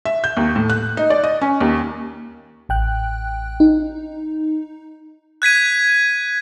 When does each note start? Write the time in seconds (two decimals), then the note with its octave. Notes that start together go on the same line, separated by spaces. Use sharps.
0.05 E5
0.24 G6
0.37 D#2
0.56 A2
0.70 F#6
0.97 D#4
1.10 D5
1.24 D#5
1.41 C#4
1.61 D#2
2.69 A1 G5 F#6
3.60 D#4
5.42 F#6 G#6 B6 D#7